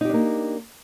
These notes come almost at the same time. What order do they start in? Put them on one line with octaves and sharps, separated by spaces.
D#4 G4 D4 A#3